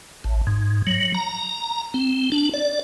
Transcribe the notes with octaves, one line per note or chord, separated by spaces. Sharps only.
A1
G#2
F#3
A#5
C4
D4
D5